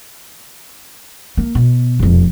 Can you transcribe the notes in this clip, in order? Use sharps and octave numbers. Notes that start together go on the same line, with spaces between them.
A#3
B2
E1 F2